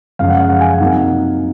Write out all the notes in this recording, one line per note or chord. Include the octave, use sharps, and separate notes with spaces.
F#2 C#3 F3 G#3 C#4 F5
F#5
F5
F#5
G#5
F5
C3 F#3 A#3 D#4 F#5